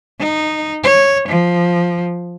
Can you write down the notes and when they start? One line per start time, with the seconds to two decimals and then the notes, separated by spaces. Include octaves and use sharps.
0.19 D#4
0.83 C#5
1.28 F3